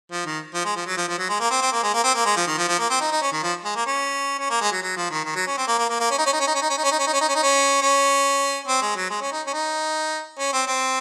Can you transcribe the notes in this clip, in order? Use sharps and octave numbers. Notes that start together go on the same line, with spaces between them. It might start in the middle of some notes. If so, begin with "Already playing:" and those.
F3
D#3
F3
G#3
F3
F#3
F3
F3
F#3
G#3
A#3
C4
C4
A#3
G#3
A#3
C4
A#3
G#3
F3
D#3
F3
F3
A#3
C4
D#4
D#4
C#4
D#3
F3
G#3
A#3
C#4
C#4
A#3
G#3
F#3
F#3
F3
D#3
D#3
F#3
C#4
C4
A#3
A#3
A#3
A#3
C#4
D#4
C#4
D#4
C#4
D#4
C#4
D#4
C#4
D#4
C#4
D#4
C#4
D#4
C#4
D#4
C#4
D#4
C#4
C#4
C4
G#3
F#3
G#3
C#4
D#4
C#4
D#4
C#4
C4
C4